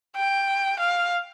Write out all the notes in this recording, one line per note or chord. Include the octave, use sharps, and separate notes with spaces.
G5
F5